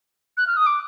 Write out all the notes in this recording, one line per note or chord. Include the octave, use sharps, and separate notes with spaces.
F#6
F6
D#6
D6